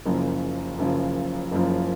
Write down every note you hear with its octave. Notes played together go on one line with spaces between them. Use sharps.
F#1 F#2 C#3 F3
F#1 F#2 C#3 F3
F#1 F#2 C#3 F3